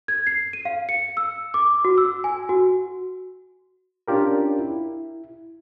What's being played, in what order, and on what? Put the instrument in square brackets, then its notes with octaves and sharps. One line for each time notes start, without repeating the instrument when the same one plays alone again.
[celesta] G#6
C7
D#7
F5
C#7
E6
D6
F#4
E6
G#5
F#4
[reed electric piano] C#4 D4 F4 G4 A#4
E4